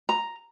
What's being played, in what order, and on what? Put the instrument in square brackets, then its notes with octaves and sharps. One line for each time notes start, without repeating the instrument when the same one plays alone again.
[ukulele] A#5